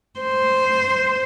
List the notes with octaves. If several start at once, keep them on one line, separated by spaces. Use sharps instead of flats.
C5